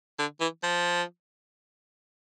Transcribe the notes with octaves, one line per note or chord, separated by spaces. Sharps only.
D3
E3
F3